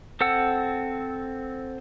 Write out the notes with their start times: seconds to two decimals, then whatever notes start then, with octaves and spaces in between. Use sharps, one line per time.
0.21 C4 A4 F#5 E6